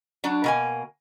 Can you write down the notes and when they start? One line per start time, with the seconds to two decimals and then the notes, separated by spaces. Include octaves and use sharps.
0.24 F#3 D4
0.44 B2 A#3 G#5